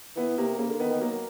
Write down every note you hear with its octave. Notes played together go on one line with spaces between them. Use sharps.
E3 B3
C3 A#3
C#3 A#3
D3
D#3 B3
D#3
F#3 A#3